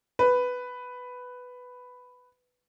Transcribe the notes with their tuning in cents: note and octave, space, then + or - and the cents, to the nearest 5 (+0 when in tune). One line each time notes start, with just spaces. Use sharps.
B4 +5